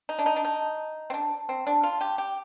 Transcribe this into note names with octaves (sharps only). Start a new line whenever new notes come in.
D#4
D4
D#4
D4
D#4
C4
D4
C4
D4
F4
G4
G4